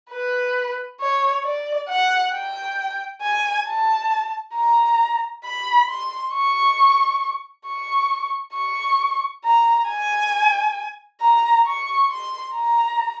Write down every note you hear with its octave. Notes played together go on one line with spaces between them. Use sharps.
B4
C#5
D5
F#5
G5
G#5
A5
A#5
B5
C6
C#6
C#6
C#6
A#5
G#5
A#5
C#6
C6
A#5